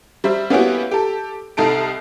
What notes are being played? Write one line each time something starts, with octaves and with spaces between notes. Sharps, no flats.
G3 C5 E5
A#3 B3 C#4 E4 F#4 G4
G4 A4
C2 D#4 A4 D7